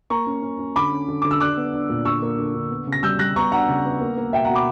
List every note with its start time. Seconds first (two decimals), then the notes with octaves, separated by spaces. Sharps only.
0.10 A#3 A#5 C#6
0.27 C#4
0.42 C#4
0.59 C#4
0.76 D3 B5 D6
0.92 C#4
1.08 D3
1.22 D3 D6
1.31 E6
1.40 D4 D6 F#6
1.57 B3
1.73 D4
1.89 A#2
2.05 D3 C#6 E6
2.22 A#3
2.38 D3
2.55 D3
2.70 B3
2.87 C#3
2.92 A#6
3.03 G3 E6 G6
3.19 G3 F#6 A#6
3.36 B3 A#5 C#6
3.52 D4 F#5 A#5
3.68 C#3
3.85 B3
4.01 A#3
4.18 A#3
4.33 B2 E5 G5
4.45 F#5 A#5
4.50 B2
4.55 B5 D6